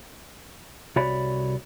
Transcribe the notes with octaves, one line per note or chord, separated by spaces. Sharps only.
C2 F#4 C#5 D5 B5